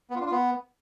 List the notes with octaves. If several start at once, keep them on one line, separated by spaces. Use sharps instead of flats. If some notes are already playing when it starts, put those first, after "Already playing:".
B3
F4
D4
F4
B3